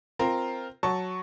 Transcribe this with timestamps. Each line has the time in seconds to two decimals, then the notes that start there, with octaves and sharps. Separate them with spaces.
0.19 C4 F4 A#4
0.83 F#3 A5 C#6